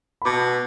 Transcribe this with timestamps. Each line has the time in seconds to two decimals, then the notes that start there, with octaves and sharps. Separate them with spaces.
0.22 B5
0.25 B2 A5 D6